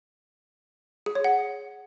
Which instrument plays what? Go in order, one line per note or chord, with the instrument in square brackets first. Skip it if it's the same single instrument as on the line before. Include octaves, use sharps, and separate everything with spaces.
[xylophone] G#4
C#5
F#5